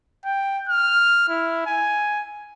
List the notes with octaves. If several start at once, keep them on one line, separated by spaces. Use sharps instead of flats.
G5
F6
E4
G#5